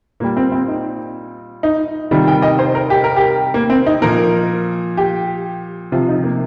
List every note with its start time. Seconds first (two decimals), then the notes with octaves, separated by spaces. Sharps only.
0.20 A#2 A#3
0.24 G3
0.37 C4
0.52 C4
0.68 D#4
1.63 D#4
2.11 C3 D#3 G3 F4
2.28 G5
2.42 D#5
2.59 C5
2.75 A#4
2.90 G4
3.04 A#4
3.16 G4
3.54 A#3
3.70 C4
3.86 D#4
4.02 A#2 F3 A#4
4.97 G4
5.92 C3 F3 F4
6.09 D#4
6.24 A#3